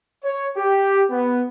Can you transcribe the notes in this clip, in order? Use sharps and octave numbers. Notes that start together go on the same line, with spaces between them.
C#5
G4
B3